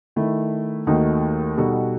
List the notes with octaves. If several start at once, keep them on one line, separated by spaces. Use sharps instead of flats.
D#3 A3 E4
D#2 D#3 A3 D#4 F#4
B2 G3 D#4 F#4 A4